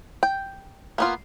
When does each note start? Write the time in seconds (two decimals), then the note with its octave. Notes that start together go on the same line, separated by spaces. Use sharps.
0.23 G5
0.98 A#3 B3 F4